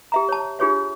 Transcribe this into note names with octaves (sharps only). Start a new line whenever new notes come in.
G4 E5 A#5
C#5 A5
D4 F4 G4 G#4 C#5 E5